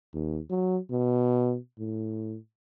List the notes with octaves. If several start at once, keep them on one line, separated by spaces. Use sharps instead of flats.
D#2
F#3
B2
A2